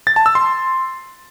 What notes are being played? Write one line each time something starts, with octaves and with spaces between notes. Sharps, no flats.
A6
A5
E6
C6